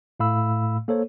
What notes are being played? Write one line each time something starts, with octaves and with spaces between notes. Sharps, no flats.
A2 A3 F5 B5 E6
A#3 A4 C5 C#5